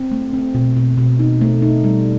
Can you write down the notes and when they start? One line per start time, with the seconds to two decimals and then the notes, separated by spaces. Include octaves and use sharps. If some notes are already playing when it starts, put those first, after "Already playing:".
Already playing: C4
0.11 A3
0.33 C4
0.54 B2
0.77 B2
0.97 B2
1.19 D#4
1.41 A3
1.62 D#4
1.84 G3